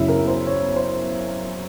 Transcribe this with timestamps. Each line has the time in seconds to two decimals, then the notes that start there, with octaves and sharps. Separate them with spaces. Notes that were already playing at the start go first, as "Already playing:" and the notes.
Already playing: F#2 C#3 F#3 E4
0.08 A#4
0.28 C5
0.46 C#5
0.76 C5